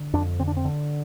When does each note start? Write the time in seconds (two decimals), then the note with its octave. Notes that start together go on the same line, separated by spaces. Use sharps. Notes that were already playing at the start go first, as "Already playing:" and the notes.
Already playing: D3
0.13 F2 D4
0.39 D3 C4
0.48 D4
0.57 C4
0.65 D3